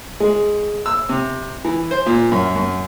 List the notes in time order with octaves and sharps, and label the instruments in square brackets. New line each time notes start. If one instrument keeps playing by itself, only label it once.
[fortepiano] G#3
E6
C3
E3
C5
A#2
F#2
F#2